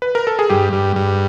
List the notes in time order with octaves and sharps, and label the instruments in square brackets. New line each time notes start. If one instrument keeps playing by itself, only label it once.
[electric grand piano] B4
A#4
A4
G#4
[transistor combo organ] G2 [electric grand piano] G4
[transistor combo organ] G2
G2